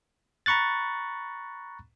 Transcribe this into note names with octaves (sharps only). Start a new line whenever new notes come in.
A#5 B5 C#6 F#6 A6